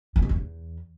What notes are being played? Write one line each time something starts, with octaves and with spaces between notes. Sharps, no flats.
A#2
B2
F2
E2